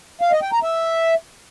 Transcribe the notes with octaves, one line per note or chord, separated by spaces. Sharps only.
F5
D#5
G5
A#5
E5